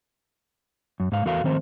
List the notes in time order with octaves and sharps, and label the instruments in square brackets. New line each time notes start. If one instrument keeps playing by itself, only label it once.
[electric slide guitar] F#2
G#2 G#3 F5
E2 F#4 A4 A#4 F5
D#3 F3 A3 C4 C5